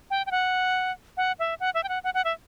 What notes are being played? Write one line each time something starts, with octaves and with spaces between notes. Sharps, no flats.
G5
G5
F#5
F#5
E5
F#5
E5
G5
F#5
F#5
F#5
E5